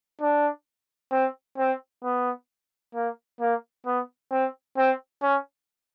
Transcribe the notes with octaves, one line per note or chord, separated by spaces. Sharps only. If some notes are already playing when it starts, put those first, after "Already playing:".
D4
C4
C4
B3
A#3
A#3
B3
C4
C4
C#4